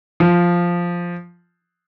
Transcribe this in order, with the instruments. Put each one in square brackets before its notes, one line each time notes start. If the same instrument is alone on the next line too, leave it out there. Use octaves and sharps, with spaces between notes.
[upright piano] F3